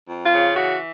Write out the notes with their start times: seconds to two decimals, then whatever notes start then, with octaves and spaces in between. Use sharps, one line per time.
0.09 F2
0.25 F4
0.32 C#3
0.56 E3 F#4